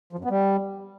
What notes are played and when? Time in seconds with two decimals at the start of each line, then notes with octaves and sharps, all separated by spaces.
0.13 F3
0.19 F#2
0.25 B3
0.30 G3